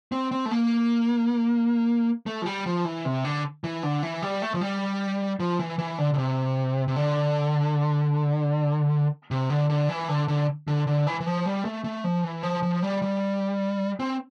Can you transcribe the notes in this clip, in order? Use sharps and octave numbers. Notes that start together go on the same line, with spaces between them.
C4
C4
A3
A#3
A3
F3
G3
F3
E3
C3
D3
E3
D3
E3
G3
A3
F3
G3
F3
E3
E3
D3
D3
C3
C3
D3
C3
D3
D3
E3
D3
D3
D3
D3
E3
E3
F3
G3
A3
A3
F3
E3
F3
F3
G3
G3
C4